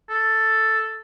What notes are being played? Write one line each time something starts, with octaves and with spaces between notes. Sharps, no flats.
A4